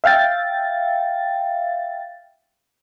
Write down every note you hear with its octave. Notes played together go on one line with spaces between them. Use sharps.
E5 F5 G5 A6